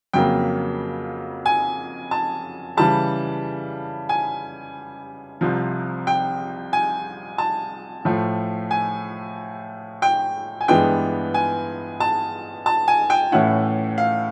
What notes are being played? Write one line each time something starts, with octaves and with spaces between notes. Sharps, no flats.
F2 C#3 F#3 A#3 G5
G#5
A5
C#3 E3 G3 A5
G#5
C2 C3 F3
G5
G#5
A5
A2 F3 A3
G#5
G5
G#5
G2 E3 G#3 B3 D4 G5
G#5
A5
A5
G#5
G5
A2 E3 A3 C#4 E4 F#5
F5